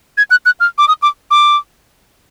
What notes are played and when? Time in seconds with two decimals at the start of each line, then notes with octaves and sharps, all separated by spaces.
0.17 G#6
0.31 F#6
0.46 F#6
0.60 F6
0.78 D6
0.88 D#6
1.02 D6
1.31 D6